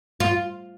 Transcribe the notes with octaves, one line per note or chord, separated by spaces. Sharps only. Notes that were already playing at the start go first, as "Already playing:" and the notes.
F4